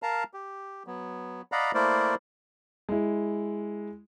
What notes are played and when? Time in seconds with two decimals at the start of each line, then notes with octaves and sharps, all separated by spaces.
0.03 A#4 F5 A5 A#5
0.34 G4
0.87 F#3 B3
1.52 D5 D#5 F5 F#5 A#5 B5
1.74 A3 A#3 E4 A#4 C5 D5
2.89 G#3 E4